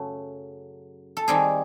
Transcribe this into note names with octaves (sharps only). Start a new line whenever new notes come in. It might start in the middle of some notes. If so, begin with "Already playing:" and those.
Already playing: F#2 C#3 F#3 A3
A4
D#3 G3 C4 G#4